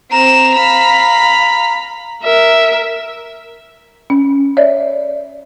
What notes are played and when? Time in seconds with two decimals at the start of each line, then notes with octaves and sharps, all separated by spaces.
0.12 C4 A#5 E7
0.55 F5 B5
2.23 A#4 E5
4.10 C#4
4.57 C#5 D5 E5